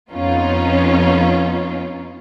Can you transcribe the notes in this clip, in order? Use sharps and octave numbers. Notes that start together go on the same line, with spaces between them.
F2 B3 C#4 D#4 F4